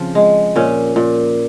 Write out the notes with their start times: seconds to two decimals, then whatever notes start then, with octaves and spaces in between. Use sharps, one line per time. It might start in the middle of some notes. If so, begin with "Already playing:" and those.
Already playing: C#3 F3 C4
0.15 G#3
0.56 A#2 C#4
0.96 A#2